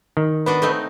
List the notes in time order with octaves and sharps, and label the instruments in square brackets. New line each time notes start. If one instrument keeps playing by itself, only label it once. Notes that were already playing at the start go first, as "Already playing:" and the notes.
[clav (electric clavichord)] D#3
[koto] B3 D4 F#4 [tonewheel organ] B4
[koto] A3 C4 D#4